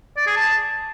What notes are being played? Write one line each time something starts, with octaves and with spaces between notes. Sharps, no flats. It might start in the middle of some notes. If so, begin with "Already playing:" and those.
D5
G#4
A5